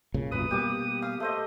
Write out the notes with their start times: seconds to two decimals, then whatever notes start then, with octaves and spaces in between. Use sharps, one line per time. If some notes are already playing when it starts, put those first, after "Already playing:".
0.14 C2 A#2 C#3
0.32 B1 F#2 A#2 B4 D#6
0.51 B2 G3 A#3 G4 D6
1.02 F5 D#6
1.20 A3 C5 D#5 D#6